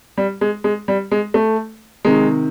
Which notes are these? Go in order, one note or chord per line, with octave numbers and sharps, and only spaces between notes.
G3
G#3
G#3
G3
G#3
A3
C3 D#3 G#3